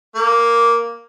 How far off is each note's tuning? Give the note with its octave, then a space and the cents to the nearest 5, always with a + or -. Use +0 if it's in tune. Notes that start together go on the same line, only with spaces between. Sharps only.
A#3 +0